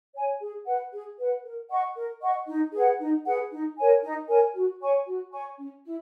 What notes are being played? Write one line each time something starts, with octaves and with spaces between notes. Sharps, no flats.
C#5 G#5
G#4
B4 F#5
G#4
B4 F#5
A#4
D#5 F#5 C#6
A#4
D#5 F#5 C#6
D#4
G#4 B4 F#5
D#4
G#4 B4 F#5
D#4
A#4 C#5 G#5
D#4
A#4 C#5 G#5
F#4
C#5 G#5 C#6
F#4
C#5 G#5 C#6
C#4
E4